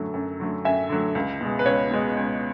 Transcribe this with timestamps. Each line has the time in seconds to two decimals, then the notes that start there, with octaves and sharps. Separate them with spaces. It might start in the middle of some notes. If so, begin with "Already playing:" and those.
Already playing: F#2 D3 F#3 A3
0.14 F#2
0.40 D3 F#3 A3
0.65 F#2 E5 G#5
0.89 D3 F#3 A3
1.15 C#2
1.41 B2 G#3
1.59 B4
1.66 C#2 C#5
1.91 B2 G#3
2.17 C#2